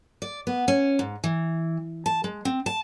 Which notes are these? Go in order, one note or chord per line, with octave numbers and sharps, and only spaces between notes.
D5
B3
C#4
G#2
E3
A5
G#3
C4
A5